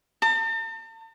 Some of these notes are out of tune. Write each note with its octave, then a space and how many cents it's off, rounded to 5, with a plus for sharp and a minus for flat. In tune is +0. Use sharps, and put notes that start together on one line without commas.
A5 +45